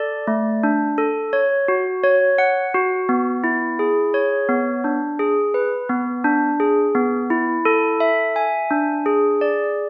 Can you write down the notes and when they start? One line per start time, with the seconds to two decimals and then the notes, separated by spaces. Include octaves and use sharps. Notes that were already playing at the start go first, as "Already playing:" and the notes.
Already playing: A4 D5
0.27 A3
0.63 D4
0.98 A4
1.33 C#5
1.68 F#4
2.04 C#5
2.38 F#5
2.74 F#4
3.09 B3
3.44 E4
3.79 G#4
4.14 C#5
4.49 B3
4.84 D4
5.19 G#4
5.54 B4
5.89 B3
6.24 D4
6.60 G#4
6.95 B3
7.30 E4
7.65 A4
8.00 E5
8.36 G#5
8.70 D4
9.06 G#4
9.41 D5